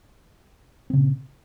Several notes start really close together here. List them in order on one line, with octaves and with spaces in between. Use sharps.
C4 C#3 A#2